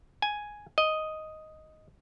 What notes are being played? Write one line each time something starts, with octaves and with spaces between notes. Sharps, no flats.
G#5
D#5